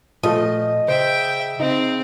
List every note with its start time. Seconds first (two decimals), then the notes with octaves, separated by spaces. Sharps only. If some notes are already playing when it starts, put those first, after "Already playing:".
0.23 A#2 F3 A3 D#5
0.88 C#3 C5 E5 G5
1.60 C#3 C4 D#4